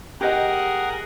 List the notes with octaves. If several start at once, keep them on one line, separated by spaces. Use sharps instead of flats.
G4 G#4 A#4 D#5 F#5 G5